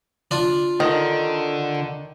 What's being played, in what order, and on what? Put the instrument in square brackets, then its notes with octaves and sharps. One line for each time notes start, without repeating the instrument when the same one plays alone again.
[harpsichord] D4 F4
[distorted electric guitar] D3 [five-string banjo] D#3